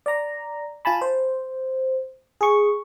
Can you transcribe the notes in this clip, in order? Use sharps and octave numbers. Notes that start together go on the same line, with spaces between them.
D5 A#5
F4 G#5 A5 B5
C5
G#4 C#6